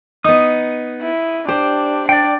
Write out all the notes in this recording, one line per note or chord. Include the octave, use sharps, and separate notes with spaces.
B3 D#4 D#6
E4
D4 G4 C5
D4 D5 G5